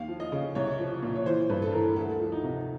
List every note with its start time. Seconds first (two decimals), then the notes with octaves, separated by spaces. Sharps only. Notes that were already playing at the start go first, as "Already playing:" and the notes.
Already playing: D#2 F5
0.08 F3
0.20 D#5
0.32 C#3
0.55 C2 C#5
0.79 F3
1.02 A#2
1.16 C#5
1.26 E3 C5
1.50 G2 B4
1.62 A4
1.73 E3 A#4
1.96 D2 A4
2.20 F3
2.32 D#4
2.44 C3